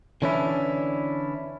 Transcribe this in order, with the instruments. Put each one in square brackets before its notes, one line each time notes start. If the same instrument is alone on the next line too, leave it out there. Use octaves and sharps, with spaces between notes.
[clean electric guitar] D3 E3 C#4 D4 E4